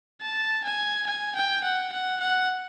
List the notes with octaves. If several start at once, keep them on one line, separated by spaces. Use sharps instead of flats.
A5
G#5
G#5
G5
F#5
F#5
F#5